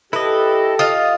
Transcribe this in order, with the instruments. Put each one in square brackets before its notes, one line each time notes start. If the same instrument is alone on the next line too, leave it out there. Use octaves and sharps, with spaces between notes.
[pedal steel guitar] E4 D#5 [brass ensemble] G4 A4 [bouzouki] B4
[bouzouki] F4 D#5 F5 [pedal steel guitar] D#6